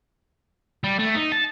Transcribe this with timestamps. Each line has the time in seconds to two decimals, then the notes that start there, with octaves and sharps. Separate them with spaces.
0.84 G3
0.99 A3
1.15 D#4
1.32 A5